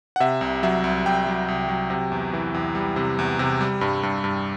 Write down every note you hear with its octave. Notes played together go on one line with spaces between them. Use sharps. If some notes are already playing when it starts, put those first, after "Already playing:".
F#5
C3 E5
C2
F#3 E5
C2
C2 G5
F#3
C2
F#3
C3
E2
E3
E2
G3
C3
E2
C3
G3
G2
G2
G2